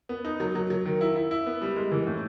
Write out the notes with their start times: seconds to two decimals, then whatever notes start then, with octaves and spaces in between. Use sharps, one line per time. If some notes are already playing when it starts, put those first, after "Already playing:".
0.09 B3
0.25 D#4
0.40 F#3
0.55 F#3
0.70 F#3
0.86 D#3
1.01 E4
1.16 E4
1.31 E4
1.46 B3
1.61 G3
1.76 G#3
1.92 E3
2.07 A2